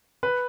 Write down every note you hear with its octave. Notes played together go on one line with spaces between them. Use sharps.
B4